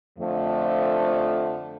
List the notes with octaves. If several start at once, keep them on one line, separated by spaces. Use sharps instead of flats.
F2 D3 F3 A3